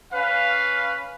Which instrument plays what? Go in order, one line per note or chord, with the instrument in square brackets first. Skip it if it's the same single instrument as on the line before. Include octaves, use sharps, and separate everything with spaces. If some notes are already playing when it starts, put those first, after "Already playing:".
[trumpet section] C#4 B4 F5